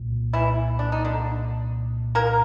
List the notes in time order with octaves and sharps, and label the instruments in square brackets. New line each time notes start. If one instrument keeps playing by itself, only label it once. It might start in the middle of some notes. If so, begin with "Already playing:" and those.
Already playing: [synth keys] C2 A#2
[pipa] E3 E4
D4
D#4
D3 D4
A#3 A#4